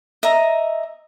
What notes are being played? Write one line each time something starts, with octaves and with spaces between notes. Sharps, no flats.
D#5 E5 A#5